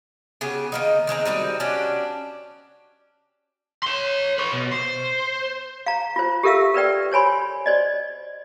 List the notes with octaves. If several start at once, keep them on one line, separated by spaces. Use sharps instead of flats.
C#3 B3 F#4 G4
D#3 A#3 D#4
D#3 G#3 C4 A#5
G3 C4 D#4 F#4
C#4 D4 F#4 G4
C#5 C6
B4 C#5
B2
C5
F5 A#5
F4 C5
G4 A4 A#4 E5 F5 E6
A#4 B4 D5 G5
C5 C#5 G#5 B5 C6
C5 D5 D#5